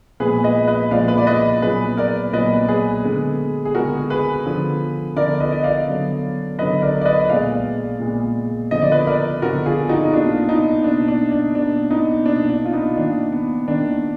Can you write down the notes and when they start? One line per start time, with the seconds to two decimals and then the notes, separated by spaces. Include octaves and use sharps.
0.20 A#2 F3 G#3 B3 G#4 B4
0.44 B4 D#5
0.68 B4 D#5
0.91 A#2 F3 G#3 B3 D5 F5
1.08 B4
1.18 D5
1.27 B4 D#5
1.62 A#2 F#3 B3 G#4 B4
1.97 A#4 D5
2.33 A#2 F#3 B3 B4 D#5
2.68 G#4 B4
3.04 D3 G#3 B3
3.65 G#4
3.75 D3 G#3 B3 F#4 A#4
4.10 G#4 B4
4.46 D3 F3 B3
5.17 D3 F3 B3 A#4 D5
5.40 B4 D#5
5.52 D#5
5.64 D5 F5
5.88 D3 F#3 B3
6.59 D3 F#3 B3 B4 D#5
6.82 A#4 D5
7.01 D5
7.05 B4 D#5
7.29 A#2 G#3 B3 D5 F5
8.00 A#2 G#3 B3
8.71 D3 F3 B3 D#5
8.82 D5
8.92 B4 D#5
9.07 A#4 D5
9.42 D3 F3 B3 F#4 A#4
9.66 F4 G#4
9.89 D#4 F#4
10.04 D#4
10.13 B2 A#3 D4 F4
10.48 B3 D#4
10.84 B2 A#3 D4
11.08 D4
11.32 D4
11.55 B2 A#3 D4
11.91 B3 D#4
12.26 B2 A#3 D4
12.50 D4
12.65 F4
12.73 B3 D#4
12.97 D#3 A#3 D4
13.32 B3
13.68 D#3 A#3 D4